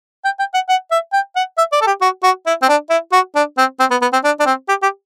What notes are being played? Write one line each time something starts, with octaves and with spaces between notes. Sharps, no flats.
G5
G5
F#5
F#5
E5
G5
F#5
E5
D5
A4
G4
F#4
F#4
E4
C4
D4
E4
F#4
D4
C4
C4
B3
B3
C4
D4
D4
C4
G4
G4